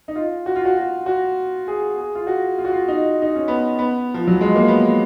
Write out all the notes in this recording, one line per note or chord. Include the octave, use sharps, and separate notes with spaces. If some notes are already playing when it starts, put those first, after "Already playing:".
D#4
F4
F#4
F4
F#4
F#4
F#4
G#4
G#4
F4
F#4
F4
F#4
F4
D#4
D#4
C#4
B3
B3
F3
F#3
G#3
A#3
B3